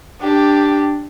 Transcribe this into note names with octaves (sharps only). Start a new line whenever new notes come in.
D4 G4